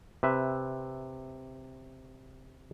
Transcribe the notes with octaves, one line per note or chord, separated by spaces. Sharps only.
C3 B4 E5